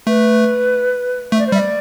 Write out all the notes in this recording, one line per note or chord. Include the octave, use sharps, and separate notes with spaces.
A3 B4
A3 E5
D5
C5
G3 E5
D5